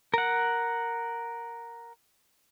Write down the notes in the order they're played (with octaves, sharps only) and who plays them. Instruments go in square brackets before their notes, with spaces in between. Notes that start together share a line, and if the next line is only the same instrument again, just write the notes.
[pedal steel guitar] A#4 F#5